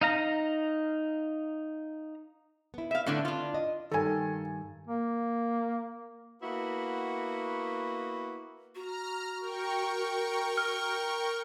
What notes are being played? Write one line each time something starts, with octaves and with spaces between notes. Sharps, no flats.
D#4 F5 A#5
B3 E4
E5 F5
A2 D3 D4
D4 F4
D#5
G2 D#3 A4 G#5
A#3
A#3 B3 E4 F#4
F#4 A#5 F6
A#4 G5 C#6
F6